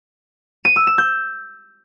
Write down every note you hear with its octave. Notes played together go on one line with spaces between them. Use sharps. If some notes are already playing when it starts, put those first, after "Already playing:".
D#7
E6
E7
G6